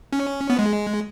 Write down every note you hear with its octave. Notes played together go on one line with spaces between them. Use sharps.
C#4
B3
G#3